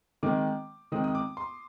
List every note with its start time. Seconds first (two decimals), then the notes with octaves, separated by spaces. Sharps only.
0.23 D#3 G#3 C4 D6
0.92 D#3 G#3 C4 D#6
1.04 D#6
1.15 D6
1.37 C6